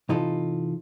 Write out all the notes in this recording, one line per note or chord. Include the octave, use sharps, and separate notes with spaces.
C3 E3 D#4 F4 A4